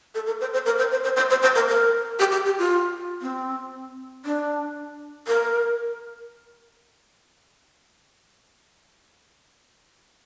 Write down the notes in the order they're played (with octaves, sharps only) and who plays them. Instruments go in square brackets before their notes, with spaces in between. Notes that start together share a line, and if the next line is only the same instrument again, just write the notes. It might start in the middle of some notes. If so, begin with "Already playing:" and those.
[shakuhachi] A4
A#4
C5
C5
A#4
C5
C5
C5
C5
C5
C5
A#4
A#4
G4
G4
G4
F4
C4
D4
A#4